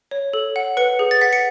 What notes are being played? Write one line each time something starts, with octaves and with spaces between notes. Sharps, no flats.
C#5
A4
F#5
B4 C#7
G#4
A6
F#5 B6
C#7